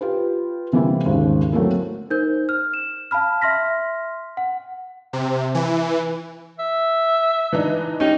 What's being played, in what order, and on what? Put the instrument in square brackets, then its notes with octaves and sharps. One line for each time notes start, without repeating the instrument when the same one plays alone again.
[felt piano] F4 G4 B4
C3 E3 G3 A#3 C4 E4
G#1 D#2 C#3
F#3 A3 A#3 C4 E4 A#4
[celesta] D#4 A#4 C5 G6
F6
E7
F5 A5 B5 F6
E5 C6 F6 A#6 B6
F#5
[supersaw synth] C3
E3
[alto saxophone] E5
[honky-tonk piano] E3 D4 D#4
[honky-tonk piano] C#4 G4 [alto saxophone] D#4